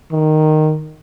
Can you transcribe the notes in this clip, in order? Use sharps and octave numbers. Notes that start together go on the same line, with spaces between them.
D#3